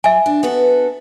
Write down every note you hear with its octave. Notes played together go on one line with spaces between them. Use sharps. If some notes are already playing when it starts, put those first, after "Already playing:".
F#3 E5 G#5
D4
B3 F#4 A4